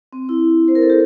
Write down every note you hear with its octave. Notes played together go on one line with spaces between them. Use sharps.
C4
E4
C5
A#4
A4
G4